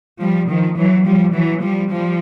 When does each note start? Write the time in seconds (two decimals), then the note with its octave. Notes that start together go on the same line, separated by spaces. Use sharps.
0.21 F3 G3
0.48 D#3 F3
0.77 E3 F#3
1.05 F3 G3
1.33 E3 F#3
1.62 F3 G3
1.90 F3 G3